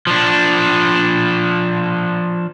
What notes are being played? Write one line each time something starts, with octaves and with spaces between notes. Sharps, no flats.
F3 D4